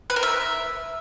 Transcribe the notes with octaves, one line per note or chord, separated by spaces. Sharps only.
B4
A#4
E5